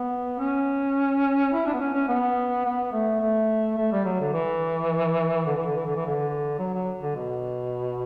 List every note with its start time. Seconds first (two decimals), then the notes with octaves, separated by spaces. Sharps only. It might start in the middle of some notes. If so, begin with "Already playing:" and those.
Already playing: B3
0.39 C#4
1.52 E4
1.66 D4
1.73 B3
1.80 C#4
1.94 C#4
2.08 B3
2.65 B3
2.92 A3
3.20 A3
3.77 A3
3.91 G3
4.05 F#3
4.20 D3
4.33 E3
5.46 D3
5.56 E3
5.66 D3
5.76 E3
5.86 D3
5.96 E3
6.06 D3
6.59 F#3
6.74 F#3
7.01 D3
7.16 B2